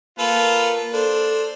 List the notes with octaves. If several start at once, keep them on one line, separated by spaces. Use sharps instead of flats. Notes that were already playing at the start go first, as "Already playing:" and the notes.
A#3 F4 A4 B4
D4 A4 C5